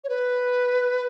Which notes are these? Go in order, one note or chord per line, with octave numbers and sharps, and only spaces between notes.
C#5
B4